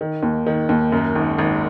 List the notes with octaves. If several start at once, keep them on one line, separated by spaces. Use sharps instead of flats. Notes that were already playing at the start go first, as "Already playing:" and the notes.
D#3
D#2
D#3
D#2
F#2
G#1
G#1